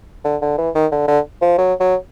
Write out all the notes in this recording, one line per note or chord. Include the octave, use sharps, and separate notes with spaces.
D3
D3
E3
D#3
D3
D3
F3
F#3
F#3